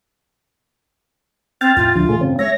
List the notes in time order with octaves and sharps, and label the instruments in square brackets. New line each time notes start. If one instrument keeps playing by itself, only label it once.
[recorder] C4 [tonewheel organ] G5 F6 A6
[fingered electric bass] F2 A2 [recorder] F4
[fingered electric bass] D2 [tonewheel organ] D3 F3
[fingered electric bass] A#2 E3 [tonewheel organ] A3 G#4
[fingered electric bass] G2 C#3 [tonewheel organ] C4 C#4
[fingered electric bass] G#3 [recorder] C#5 [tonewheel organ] E5 A#6